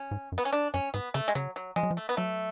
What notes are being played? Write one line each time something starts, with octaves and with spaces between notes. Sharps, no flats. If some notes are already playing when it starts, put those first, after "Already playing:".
Already playing: C#4
G#2
F#2
B3
C#4
D4
F#2 C#4
G#2 B3
C#3 A3
G#3
C#3 F#3
F#3
F3 G#3
F#3
F3
A3
B3
F#3 A3